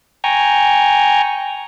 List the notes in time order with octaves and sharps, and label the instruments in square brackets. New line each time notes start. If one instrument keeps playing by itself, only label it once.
[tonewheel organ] G5 G#5 A#5 C#6